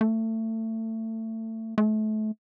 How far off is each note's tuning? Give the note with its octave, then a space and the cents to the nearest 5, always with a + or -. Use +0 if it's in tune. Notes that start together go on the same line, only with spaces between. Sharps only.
A3 +25
A3 -30